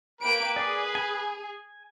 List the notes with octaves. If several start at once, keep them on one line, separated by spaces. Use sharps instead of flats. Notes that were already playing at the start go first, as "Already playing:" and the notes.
A#3 B4 G5 D7
G#4 D5
G#5